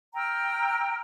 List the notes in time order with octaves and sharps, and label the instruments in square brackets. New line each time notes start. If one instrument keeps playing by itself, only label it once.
[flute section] G5 A#5 E6 F6